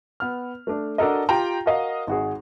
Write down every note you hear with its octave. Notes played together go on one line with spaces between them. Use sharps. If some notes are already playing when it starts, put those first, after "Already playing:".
B3 F6
A3 D4
D4 F#4 A4 A#4 D#5
F4 G4 G5 A#5
F#4 A#4 D#5 F5
G#1 F#4 G#4